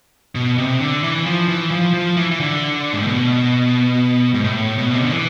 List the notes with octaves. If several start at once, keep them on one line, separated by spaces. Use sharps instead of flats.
B2
C3
D3
E3
F3
E3
F3
F3
E3
E3
D3
G#2
A2
B2
G#2
A2
B2
C3
D3
E3